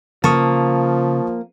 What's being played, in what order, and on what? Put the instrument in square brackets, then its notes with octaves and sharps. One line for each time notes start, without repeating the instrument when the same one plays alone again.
[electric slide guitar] C#3 [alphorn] F3 [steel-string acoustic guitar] A#3 [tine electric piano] A5 C#6 D#6